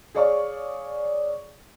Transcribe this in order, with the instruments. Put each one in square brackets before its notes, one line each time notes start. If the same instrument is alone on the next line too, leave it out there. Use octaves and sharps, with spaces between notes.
[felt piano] G#4 C#5 D5 F5 C#6